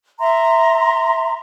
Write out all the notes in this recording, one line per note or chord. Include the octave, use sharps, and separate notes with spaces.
E5 A#5 C6